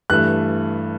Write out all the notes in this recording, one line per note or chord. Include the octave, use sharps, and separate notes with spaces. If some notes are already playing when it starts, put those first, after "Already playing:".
G2 E3 A3 F#6